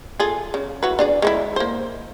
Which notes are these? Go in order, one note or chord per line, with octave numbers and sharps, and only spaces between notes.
F4 G#4 A4
C#3
E4 F#4 B4
D4 G#4 D5
G#3 C#4 E4
A#3 C5